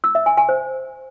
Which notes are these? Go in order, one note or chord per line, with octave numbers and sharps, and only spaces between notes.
E6
E5
G#5
G#5
C5